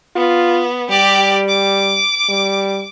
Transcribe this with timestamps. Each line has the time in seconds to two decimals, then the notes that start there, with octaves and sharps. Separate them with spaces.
0.16 B3 F4
0.91 G3 G4 D5
1.48 D6
2.29 G3